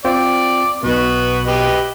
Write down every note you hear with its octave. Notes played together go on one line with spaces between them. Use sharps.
C4 F4 D5 G5
B1 B2 B3 F#4
G4 B4 D#5